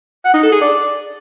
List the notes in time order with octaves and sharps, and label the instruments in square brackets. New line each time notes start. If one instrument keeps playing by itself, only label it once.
[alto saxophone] F#5
D#4
A4
G#4
D5